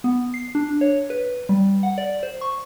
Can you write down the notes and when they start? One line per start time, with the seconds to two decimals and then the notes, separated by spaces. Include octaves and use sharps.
0.04 B3
0.34 C7
0.55 D4
0.81 C#5
1.10 B4
1.49 G3
1.83 F#5
1.98 D5
2.23 C5
2.41 C#6